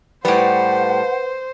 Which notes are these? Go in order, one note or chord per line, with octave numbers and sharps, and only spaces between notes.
A2 G3 B4 C5 F#5